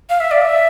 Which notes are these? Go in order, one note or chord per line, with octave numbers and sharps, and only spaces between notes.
F5
E5
D5
E5